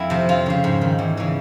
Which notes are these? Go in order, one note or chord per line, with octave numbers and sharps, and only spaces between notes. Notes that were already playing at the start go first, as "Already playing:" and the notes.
Already playing: F2 E4
C3 F3
F2 F4
C#3 F3
G#2
D#3
E2
C#3 E3